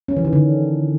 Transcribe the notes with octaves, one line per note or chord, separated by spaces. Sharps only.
C#4
E3
D#3
D3